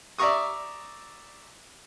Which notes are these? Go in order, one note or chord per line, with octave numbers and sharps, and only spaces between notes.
D5 E5 A#5 C#6 D#6